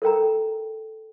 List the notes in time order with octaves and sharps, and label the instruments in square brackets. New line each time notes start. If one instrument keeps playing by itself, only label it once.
[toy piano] A4 A#4 G5 A#5